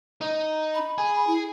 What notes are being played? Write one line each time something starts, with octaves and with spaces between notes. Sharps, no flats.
D#4
B5
G#4
E4